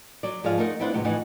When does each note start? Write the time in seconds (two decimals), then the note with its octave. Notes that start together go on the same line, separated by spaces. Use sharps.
0.23 F#3 D5
0.43 G#2 F3 G#4 D5 E5 F5
0.58 A3 D#4 F4 A#4 D#5 F#5
0.79 B3 C4 D4 E4 F4 F#5
0.93 A2 C3 E3 F#3 G#3 C#4
1.04 F2 A2 E3 D#4 E4 F#5